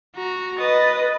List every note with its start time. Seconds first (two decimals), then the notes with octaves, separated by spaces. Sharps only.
0.15 F#4 A#5
0.59 B4 D#5 D#6 A6